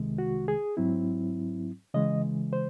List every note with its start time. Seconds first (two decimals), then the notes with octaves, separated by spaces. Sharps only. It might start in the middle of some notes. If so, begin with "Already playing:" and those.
Already playing: C2 C3 D#3 G#3
0.18 F#4
0.48 G#4
0.77 G#2 F#3 C4 E4
1.94 C#3 E3 G#3 D#5
2.53 C5